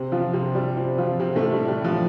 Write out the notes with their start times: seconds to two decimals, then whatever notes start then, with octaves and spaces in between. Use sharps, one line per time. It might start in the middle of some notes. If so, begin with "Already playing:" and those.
Already playing: C3 C4
0.12 F3 F4
0.33 C3 C4
0.55 G3
0.77 C3 C4
0.98 F3 F4
1.20 C3 C4
1.36 A2 A3
1.52 G3
1.68 G3
1.84 F3